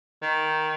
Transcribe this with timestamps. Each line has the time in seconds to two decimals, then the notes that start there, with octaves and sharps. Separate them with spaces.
0.22 D#3